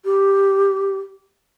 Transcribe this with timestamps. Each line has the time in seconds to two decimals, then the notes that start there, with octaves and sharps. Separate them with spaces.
0.05 G4